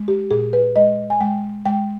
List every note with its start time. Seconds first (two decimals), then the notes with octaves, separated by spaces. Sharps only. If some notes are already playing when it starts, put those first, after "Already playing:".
Already playing: G#3
0.08 G4
0.31 A#2 G#4
0.53 B4
0.76 G#3 D#5
1.10 G#5
1.21 G#3 G5
1.66 G#3 G5